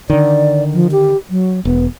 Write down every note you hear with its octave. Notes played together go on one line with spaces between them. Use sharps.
D3 D#3 D5
F3
G4
F#3
E1 B3